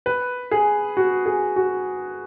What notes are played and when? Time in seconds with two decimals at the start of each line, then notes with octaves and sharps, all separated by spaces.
0.06 B4
0.51 G#4
0.97 F#4
1.26 G#4
1.56 F#4